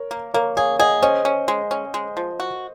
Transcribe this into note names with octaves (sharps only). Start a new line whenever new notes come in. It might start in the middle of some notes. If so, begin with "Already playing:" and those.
Already playing: A#4 C#5
A#3
A#3 A#4 C#5
G#4 C#5 F5
G#4 D#5 F#5
C#4 C5 D#5
C#4
G#3
C#4
G#3
F3
F#4